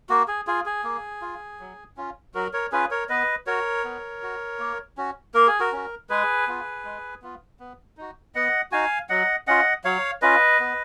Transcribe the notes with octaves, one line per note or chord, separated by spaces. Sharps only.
A#3 F#4
G#4
F4 G#4
G#4
A#3
F4
F#3
C#4 F4
F#3 F#4 A#4
A#4 C#5
C#4 F4 G#4 B4
A#4 C#5
B3 B4 D#5
F#4 A#4 C#5
B3
F#4
A#3
C#4 F#4
A#3 A#4
G#4
F#4 A#4
C#4 F#4
G#3 G#4 B4
B3 F4
G#3
B3 F4
B3
D#4 F#4
B3 D#5 F#5
D#4 F#4 F5 G#5
F#3 D#5 F#5
C#4 F4 D#5 F#5
F#3 C#5 F5
C#4 F4 B4 D#5
B3